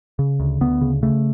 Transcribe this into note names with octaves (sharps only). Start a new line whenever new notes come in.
C#3
D2
D2 B3
C#3
C#3 A3